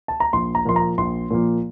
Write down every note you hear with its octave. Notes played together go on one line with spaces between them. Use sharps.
A5
A#5
A#1 C6
A#5
A#2 F3 A#3 C6
A#5
A#1 C6
A#2 F3 A#3